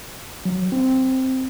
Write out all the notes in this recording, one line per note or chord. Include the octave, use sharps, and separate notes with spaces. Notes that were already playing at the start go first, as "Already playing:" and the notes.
F#3
C4